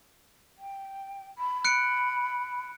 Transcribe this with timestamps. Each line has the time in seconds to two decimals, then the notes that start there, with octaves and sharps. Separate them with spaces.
0.58 G5
1.37 B5
1.65 F#6 C#7 D7